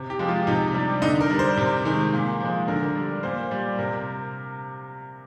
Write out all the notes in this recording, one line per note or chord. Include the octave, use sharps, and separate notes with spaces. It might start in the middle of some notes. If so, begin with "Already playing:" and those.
Already playing: C3
G4
F3 G#3
F4
C3 D#4
G3 D4
D3 D#4
A#4
G3
C5
C3
D#3 G#3
A#2
F3 G#3
D3 A#4
G3
A#2 C5
G3
C3 A#4